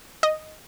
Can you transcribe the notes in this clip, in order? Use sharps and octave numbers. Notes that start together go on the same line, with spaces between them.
D#5